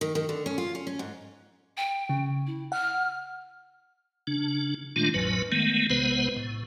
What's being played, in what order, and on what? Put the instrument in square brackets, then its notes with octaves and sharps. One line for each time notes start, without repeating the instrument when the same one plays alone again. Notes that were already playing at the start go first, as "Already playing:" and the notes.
[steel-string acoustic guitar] D#3
D#3
D3
C#4
F4
C#4
C#4
G#2
[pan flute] G5
[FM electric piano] C#3
[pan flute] E4
[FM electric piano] F#5 [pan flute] F6
[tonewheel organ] C#3 D4
A#2 D#3 G#3 A3 D4 F4
G#1 F2 A2 F#3 B4
D#3 G#3 A3 B3
B1 C3 G#3 B3 B4 C5
A2